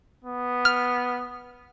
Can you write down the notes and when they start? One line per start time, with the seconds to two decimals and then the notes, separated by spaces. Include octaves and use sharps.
0.25 B3
0.65 F6